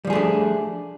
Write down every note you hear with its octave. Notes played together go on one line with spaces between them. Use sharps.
F3 G3 A3 D4 G#4